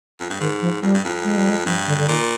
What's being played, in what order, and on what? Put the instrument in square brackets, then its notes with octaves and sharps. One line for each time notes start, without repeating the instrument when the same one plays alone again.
[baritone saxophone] F2
G2
[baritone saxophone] G#2 [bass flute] D#3
[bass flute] F3
[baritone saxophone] F2 [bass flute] G3
[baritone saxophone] G2
F2
[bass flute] G#3
G3
G#3
[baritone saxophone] G2 [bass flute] F3
[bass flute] D3
D3
[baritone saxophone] A#2 [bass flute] D#3